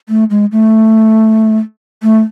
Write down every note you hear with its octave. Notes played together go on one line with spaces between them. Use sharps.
A3
G#3
A3
A3